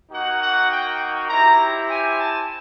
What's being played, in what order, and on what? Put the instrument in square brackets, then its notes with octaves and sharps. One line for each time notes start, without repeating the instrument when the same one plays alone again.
[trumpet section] A#3 D#4 F#4 F#5
F#5
G5
C4 E4 G4 A#5
G#5
A5